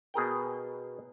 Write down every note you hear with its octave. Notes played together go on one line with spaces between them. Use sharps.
B2 G#4 A#4 G5